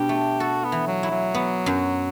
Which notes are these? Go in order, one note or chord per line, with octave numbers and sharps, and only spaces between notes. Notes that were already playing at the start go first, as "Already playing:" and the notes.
Already playing: B2 D4 G4
A3
F#4 A4
B3
E3
F#3
E4
F#3
B3
F#2